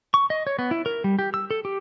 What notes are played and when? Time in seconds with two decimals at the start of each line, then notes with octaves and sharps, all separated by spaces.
0.14 C#6
0.30 D#5
0.47 C#5
0.59 B3
0.71 E4
0.86 A#4
1.04 G3
1.19 G4
1.34 E6
1.51 A4
1.65 G4